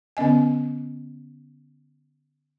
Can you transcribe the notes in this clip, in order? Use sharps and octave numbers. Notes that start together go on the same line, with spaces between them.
D3 B3 C#4 D#5 G#5